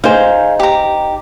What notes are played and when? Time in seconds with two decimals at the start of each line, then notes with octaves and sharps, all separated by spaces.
0.04 D#4 G#4 C5 F5
0.60 G4 A#5